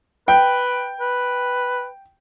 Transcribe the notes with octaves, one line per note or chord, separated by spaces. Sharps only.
B4 G5
B4